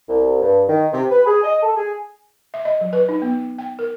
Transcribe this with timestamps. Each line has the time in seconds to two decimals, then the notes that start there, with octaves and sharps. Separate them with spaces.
0.08 C2
0.41 G2
0.68 D#3
0.92 C3
1.10 B4
1.26 G#4
1.44 D#5
1.62 A4
1.76 G#4
2.54 E5
2.65 D#5
2.81 F#3
2.93 B4
3.09 D#4
3.22 B3
3.59 G5
3.79 A#4